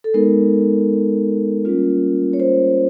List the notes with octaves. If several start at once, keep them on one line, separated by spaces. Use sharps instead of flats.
A4
G#3 B3 D#4 A#4
G3 A#3 C#4 F4
C#5
C5